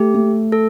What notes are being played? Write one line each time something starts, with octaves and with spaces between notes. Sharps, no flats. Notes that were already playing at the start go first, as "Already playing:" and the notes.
Already playing: A3 G4
A3
A4